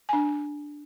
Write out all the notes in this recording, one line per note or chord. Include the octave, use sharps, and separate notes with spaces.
D4 G#5